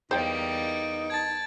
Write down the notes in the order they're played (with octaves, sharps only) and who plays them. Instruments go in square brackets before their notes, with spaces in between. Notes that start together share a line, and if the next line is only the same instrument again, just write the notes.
[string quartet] E2 G3 A#3 [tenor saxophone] D#4 [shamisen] C5 G5
[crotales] D7
[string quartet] A5 [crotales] G#6 A6